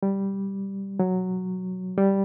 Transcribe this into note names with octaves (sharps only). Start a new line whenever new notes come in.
G3
F#3
G3